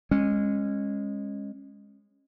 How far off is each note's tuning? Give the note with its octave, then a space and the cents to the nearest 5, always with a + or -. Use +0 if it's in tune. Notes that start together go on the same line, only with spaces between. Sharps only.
G#3 -20 C#4 -20